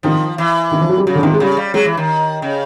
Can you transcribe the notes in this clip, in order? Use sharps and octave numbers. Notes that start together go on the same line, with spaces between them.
D#3 F3
E3
D#3
F3
F#3
G3
C#3 F#3
D3
C3 D#3
G#3
C#3 G3
G3
F#3 G#3
E3
D#3
C#3